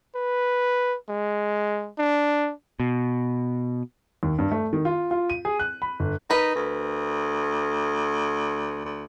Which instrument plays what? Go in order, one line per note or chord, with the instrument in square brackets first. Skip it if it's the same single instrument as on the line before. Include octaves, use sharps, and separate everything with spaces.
[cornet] B4
G#3
D4
[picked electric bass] B2
[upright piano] D#2
G2
A3
D#3
F4
F4
D#7
G#4
F#6
B5
G1
[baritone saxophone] D#4 [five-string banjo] A#4 B4
[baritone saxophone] D2
D2